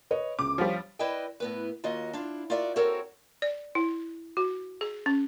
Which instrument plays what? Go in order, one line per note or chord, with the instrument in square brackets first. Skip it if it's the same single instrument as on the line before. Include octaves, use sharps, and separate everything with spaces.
[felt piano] B4 C#5 D#5
[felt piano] C#2 [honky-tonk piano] D6
[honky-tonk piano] F3 G3 [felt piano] C#5 F5
[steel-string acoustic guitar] E4 B4 C5 D5 D#5 G5
A2 B3 B4
D#2 F4 F#4 D#5
D4 E4 F4
F4 F#4 A#4 D5 E5
C4 F#4 A4 A#4 C#5
[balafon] D5
E4
F#4
G#4
C#4